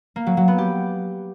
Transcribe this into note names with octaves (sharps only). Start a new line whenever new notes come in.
A#3
F#3
F#3
B3
G4